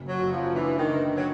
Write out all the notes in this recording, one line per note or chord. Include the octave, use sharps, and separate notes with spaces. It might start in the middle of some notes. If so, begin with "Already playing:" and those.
Already playing: F#1
F#3
F#1
F3
E3 D4
D#3
D3
F#3